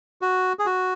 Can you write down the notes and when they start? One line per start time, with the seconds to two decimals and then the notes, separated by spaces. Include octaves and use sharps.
0.22 F#4
0.59 G#4
0.66 F#4